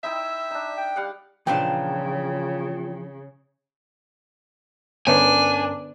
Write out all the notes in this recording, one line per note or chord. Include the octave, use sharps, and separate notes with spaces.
D#4 E4 E5 G5 E6
D4 D#4
G5
G3 F5 F#5
A#2 C#3 E3 F3 D4 F4 G5 A5
G2 D3 B3 C#4 D4 A#4 C#5 G#5